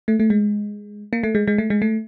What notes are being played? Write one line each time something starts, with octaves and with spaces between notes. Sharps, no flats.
A3
A3
G#3
A#3
A3
G#3
G#3
A3
G#3
A3